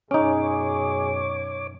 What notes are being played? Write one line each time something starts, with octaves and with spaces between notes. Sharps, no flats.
F#2 B2 C#4 D#4 G#4 C#5 D6